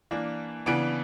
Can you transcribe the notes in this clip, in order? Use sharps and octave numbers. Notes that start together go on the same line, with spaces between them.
E3 A#3 D4
C#3 E3 B3 D4 D7